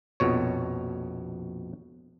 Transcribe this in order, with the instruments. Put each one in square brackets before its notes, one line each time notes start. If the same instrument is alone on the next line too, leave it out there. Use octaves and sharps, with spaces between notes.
[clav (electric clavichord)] A#1 F2 B2 C#5